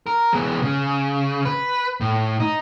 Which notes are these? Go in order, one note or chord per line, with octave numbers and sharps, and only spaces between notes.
A#4
G#3 B3
C#3
B4
A2
D#4